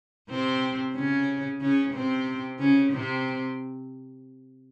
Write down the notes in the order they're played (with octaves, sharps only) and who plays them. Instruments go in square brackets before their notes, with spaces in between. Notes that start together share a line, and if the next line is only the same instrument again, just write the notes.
[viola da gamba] C3 C4
C#3 C#4
C#3 C#4
C3 C4
C#3 C#4
C3 C4